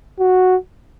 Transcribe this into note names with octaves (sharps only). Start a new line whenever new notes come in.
F#4